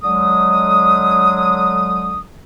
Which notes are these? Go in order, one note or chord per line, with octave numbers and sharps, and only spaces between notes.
D3 F#3 G#3 D#6